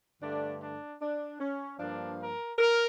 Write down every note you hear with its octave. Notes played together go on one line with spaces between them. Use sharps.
G2 D3 A3 D4
D4
D4
C#4
G2 F3 A#3 D4
A#4
A#4